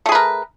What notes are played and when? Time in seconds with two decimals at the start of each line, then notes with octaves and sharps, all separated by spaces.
0.06 A3
0.09 G#4
0.12 B4
0.15 A#4